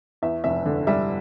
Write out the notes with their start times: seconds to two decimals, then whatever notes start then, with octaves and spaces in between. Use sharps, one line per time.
0.22 E2 E5
0.44 F1 E5
0.65 D3
0.87 G3 E5